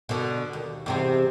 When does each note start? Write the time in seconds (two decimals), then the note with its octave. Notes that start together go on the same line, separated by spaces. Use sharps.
0.09 B2 D3
0.53 D#2
0.86 E2 C3 C4